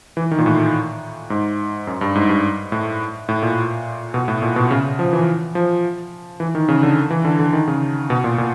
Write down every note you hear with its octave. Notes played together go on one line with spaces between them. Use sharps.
E3
D#3
A#2
A2
G#2
F#2
G2
G#2
G2
A2
A2
A#2
B2
A2
A#2
B2
C#3
F3
E3
F3
E3
D#3
C#3
D3
E3
D3
D3
D#3
C#3
B2
A#2
A#2